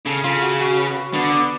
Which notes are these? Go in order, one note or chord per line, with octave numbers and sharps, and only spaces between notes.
C#3 A4
C#3 F4
F#4
F#4
B4
B4
D3 B3
B3